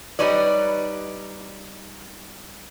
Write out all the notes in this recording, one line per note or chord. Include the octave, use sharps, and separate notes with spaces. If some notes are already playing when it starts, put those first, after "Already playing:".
G3 D#4 B4 C#5 D5